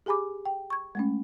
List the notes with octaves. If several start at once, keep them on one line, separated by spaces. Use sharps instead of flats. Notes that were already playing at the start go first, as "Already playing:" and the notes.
G4 G#4 G#5 B5 D6
G5
C#6 G#6
G#3 A3 C#4